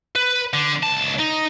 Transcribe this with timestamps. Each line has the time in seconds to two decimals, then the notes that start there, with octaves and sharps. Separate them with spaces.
0.16 B4
0.53 D3
0.83 C#2 A5
1.19 D#4